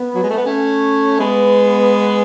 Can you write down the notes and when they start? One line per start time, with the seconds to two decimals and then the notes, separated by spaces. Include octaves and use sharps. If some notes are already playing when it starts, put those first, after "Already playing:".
Already playing: B3
0.14 F#3
0.22 G#3
0.29 A3
0.36 B3
0.45 A3 C#4
1.19 G#3 B3